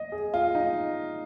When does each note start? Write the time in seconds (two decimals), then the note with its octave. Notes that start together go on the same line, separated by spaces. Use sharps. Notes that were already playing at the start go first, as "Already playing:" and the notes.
Already playing: D#5
0.12 G#4
0.34 F4
0.55 D#4